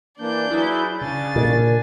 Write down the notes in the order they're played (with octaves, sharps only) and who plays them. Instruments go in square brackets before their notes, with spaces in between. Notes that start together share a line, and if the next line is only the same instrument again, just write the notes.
[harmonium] E3 A#3 D4 [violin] D5 G6
[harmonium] F#3 G#4 B4 [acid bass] E4
[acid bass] C#3 [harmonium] D4 G#5 [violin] A6
[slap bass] A#2